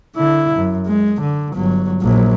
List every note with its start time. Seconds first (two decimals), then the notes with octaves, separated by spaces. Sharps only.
0.16 D3 E4
0.57 F#2
0.86 G#3
1.21 D3
1.54 G1 F#3
2.02 A#1 F#3